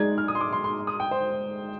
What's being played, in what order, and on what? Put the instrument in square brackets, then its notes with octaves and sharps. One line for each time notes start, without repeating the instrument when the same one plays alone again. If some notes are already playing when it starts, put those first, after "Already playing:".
Already playing: [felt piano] G#3 D#4 G#4 D5 [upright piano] G#6
[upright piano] F6
D#6
C6
D6
C6
C6
D#6
G5
C5